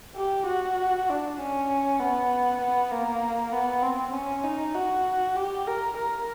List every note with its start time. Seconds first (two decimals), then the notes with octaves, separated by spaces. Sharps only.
0.16 G4
0.47 F#4
1.09 D4
1.40 C#4
2.00 B3
2.61 B3
2.91 A#3
3.52 B3
3.83 C4
4.14 C#4
4.44 D#4
4.75 F#4
5.36 G4
5.67 A#4
5.98 A#4